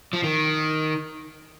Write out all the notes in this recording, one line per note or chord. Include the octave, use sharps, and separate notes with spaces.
F3
D#3